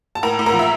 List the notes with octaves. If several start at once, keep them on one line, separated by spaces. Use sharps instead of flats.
A5
A2 A#4 A#5
A2
A#4 A#5
F3
E5